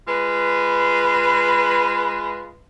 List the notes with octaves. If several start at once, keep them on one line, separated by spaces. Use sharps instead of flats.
G#3 F4 B4